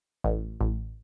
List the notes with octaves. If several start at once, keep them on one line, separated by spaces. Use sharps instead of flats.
A1
A1